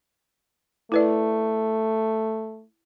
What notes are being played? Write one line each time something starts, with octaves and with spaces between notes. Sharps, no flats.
A3 E4 B4 D5